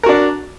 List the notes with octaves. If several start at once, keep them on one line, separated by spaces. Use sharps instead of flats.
D4 F#4 A#4